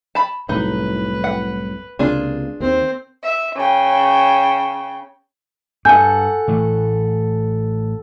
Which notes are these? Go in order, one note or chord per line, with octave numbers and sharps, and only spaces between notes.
A5 B5
C2 F#2 A2 D#4 B4
F#5
C#2 C3 A#3 D4 F4 G#4
D#2 C4 C5
E5
C#3 G5
G2 A4 F#5 G#5 G6
A2 E3 A3